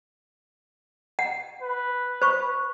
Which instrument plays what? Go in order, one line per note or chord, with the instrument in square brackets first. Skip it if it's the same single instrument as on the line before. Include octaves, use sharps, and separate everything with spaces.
[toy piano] F#5
[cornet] B4
[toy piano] C5 C#6